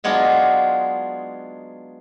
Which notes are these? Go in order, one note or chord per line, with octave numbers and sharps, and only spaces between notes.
F#3 G#3 B3 D4 D#4 F4